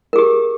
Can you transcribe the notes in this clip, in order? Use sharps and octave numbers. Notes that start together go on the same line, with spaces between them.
G4 G#4 A#4